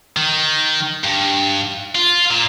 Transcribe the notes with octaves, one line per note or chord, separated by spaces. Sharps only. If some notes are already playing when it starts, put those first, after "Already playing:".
D#3
G2
F4
A#2